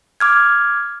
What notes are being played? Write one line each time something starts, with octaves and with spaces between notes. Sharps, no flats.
D6 F6 G#6